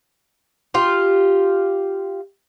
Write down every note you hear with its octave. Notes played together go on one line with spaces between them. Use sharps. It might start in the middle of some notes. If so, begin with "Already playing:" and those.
F4 G4